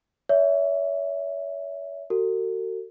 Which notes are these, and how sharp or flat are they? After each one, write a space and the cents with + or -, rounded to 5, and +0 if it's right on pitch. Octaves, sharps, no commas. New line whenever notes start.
C#5 +35 E5 -5
F#4 +25 A4 +40